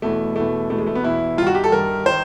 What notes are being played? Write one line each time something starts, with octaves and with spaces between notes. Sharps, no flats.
E2 B2 A3
E2 B2 A3
E2 B2 A3
G#3
A3
B3
E2 B2 E4
G2 D#3 F4 F#4
G4
A4
G2 D#3 A#4
D#3 C5